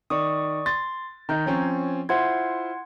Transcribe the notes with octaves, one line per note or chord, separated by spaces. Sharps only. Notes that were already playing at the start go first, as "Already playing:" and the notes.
D#3 D5 C#6 D#6
C6 A6
D#3 D#4 A#5 G6
F3 C4 C#4 C#5
E4 F4 C5 F#5 C6 G#6